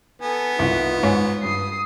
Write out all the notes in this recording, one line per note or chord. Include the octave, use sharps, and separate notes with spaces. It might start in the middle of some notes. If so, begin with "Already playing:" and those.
B3 A4 G#5
C2 D#4 F4
G#2 C#5
G2 D#6 C7